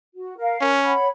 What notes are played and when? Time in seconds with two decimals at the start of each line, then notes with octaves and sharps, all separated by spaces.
0.15 F#4
0.37 A#4 F5
0.61 C#4 A#4
0.84 C#5 F#5 B5